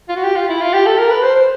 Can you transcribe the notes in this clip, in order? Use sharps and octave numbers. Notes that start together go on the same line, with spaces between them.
F4
F#4
G4
F4
E4
F4
G4
A4
A#4
B4
C5
C5